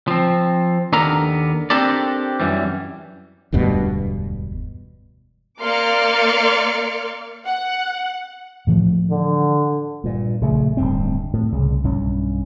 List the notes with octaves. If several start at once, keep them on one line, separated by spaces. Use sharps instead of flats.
F3 C4
D#2 B3 D4 A4 A#4 A#5
C4 D4 G4 A4 A#4 D5
F#2 E3 G3
E1 D2 G2 B2
A#3 D5 C6 D6 F6 C#7
F#5
A2 E3 F3
D3
G2 A#2
A#1 C#3 A3
D1 G2 C4
A2
C2 C#3
B1 G2 C#4